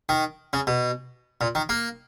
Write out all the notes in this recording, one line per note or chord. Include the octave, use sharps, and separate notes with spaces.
D#3
C#3
B2
A#2
D#3
A#3